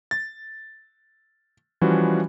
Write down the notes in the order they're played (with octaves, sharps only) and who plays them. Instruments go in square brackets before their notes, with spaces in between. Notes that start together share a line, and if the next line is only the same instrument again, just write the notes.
[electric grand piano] A6
E3 F3 G3 C#4 F#4